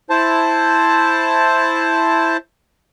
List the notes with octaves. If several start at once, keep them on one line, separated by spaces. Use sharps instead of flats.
E4 C5 A5